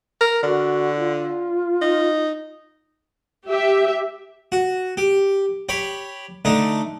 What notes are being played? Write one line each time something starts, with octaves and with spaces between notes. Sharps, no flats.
A#4
D3 F#4
F4
D#4
G4 E5
F#4
G4
G4 C#5 B5
D3 A3 D#4